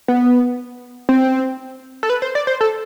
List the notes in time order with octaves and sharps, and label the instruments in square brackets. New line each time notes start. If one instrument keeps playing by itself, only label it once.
[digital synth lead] B3
C4
A4
B4
C5
D5
C5
A4